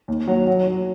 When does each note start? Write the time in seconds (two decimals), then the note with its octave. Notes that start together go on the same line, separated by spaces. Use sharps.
0.08 D#2
0.28 F#3
0.47 F#3
0.68 F#3